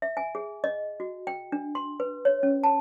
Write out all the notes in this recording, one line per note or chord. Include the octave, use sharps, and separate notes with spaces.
E5
G#5
G#4
D#5
F#4
G5
D4
C6
B4
C#5
C#4
A5